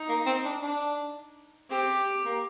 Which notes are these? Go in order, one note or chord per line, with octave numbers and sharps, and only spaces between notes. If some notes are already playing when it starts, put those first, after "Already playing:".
Already playing: D#4
A#3
C4
D4
D4
C4 G4
A#3